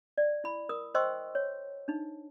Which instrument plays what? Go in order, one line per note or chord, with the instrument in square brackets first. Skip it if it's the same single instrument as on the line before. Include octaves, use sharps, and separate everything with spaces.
[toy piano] D5
E4 B5
A#4 D#6
C5 D#5 G5 C6 C#6 E6
C#5
D4 D#4